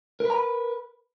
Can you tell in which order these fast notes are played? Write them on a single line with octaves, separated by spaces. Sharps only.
A#4 B4 A#5 B5